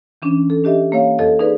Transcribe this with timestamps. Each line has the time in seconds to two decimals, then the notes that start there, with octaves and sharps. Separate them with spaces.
0.22 E3 C#4 D4
0.50 A4
0.64 D4 G4 D#5 E5
0.92 A#3 C#5 F5
1.19 F2 A4 D#5
1.39 D#4 G#4 B4 D5